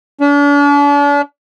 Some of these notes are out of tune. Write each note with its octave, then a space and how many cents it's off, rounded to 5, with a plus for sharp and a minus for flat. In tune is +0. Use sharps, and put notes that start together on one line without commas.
D4 -40